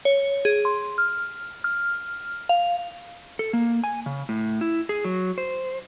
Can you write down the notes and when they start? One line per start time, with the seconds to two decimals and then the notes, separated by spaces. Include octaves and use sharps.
0.05 C#5
0.45 G#4
0.65 C6
0.98 F6
1.64 F6
2.49 F5
3.39 A4
3.53 A#3
3.84 G#5
4.06 C#3
4.29 A2
4.61 E4
4.89 G#4
5.04 F#3
5.38 C5